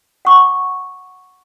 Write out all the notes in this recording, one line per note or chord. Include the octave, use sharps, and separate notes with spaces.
F#5 C#6 D6